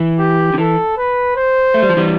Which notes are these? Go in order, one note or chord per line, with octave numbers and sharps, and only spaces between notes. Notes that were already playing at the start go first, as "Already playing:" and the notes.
Already playing: E3
G4
D3
E3 A4
B4
C5
A3
G3
F3
E3 G3